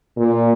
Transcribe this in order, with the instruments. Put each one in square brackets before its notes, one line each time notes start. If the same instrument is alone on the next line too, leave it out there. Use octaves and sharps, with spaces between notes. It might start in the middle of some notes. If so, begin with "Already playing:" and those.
[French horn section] A#2